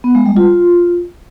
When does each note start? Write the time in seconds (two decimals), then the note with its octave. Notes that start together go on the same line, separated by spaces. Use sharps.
0.04 B3
0.15 G#3
0.26 G3
0.37 F4